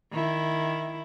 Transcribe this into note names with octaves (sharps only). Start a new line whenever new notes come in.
D#3 E4